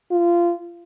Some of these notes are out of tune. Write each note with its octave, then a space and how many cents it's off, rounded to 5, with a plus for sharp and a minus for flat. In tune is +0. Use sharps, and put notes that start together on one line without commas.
F4 -20